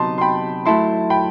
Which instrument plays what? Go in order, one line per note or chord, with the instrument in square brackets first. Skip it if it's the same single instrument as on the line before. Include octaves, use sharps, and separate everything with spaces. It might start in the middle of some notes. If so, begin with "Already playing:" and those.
Already playing: [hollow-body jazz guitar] C3 F#3 B3 D#4 [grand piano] A5 C6
[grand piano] C6
G5 B5
[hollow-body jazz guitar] F#3 A3 E4 [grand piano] A5 C6
[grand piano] G5 B5